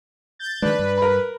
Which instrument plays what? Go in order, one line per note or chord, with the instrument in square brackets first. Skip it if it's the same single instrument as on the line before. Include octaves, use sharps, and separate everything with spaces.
[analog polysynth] G6 A6
[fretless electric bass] D#3 G#3 [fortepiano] D4 [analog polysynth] B4
[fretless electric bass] G2
[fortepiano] A#4 B5